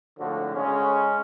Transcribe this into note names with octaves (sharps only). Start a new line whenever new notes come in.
G#1 A2 D3 F3 F#4
C#3 G#3 C#4